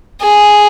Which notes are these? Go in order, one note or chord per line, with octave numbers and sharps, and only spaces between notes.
G#4